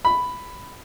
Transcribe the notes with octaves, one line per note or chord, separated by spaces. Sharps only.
B5